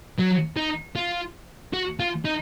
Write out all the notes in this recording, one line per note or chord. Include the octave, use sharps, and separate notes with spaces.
F#3
D#4
F4
F#4
F4
D#4